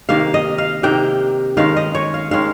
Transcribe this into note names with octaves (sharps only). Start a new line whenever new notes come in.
C3 D#3 A#3 F5
D#5
F5
C3 D#3 A#3 G5
D#3 G#3 C#4 F5
D#5
C#5
F5
D#3 G#3 C#4 F5